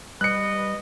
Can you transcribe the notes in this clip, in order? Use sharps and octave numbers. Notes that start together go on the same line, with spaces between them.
G3 B4 D#5 F#6 C#7